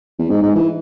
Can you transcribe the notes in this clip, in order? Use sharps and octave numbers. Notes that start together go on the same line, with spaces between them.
E2
G#2
G#2
E3